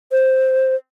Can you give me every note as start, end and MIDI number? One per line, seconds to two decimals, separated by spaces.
0.12 0.75 72